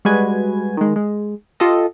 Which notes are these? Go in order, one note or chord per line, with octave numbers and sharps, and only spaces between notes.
G3 G#3 F#4 B4 G#5 G#6
D#3 G#3
G#3
F4 G4 A4 D#5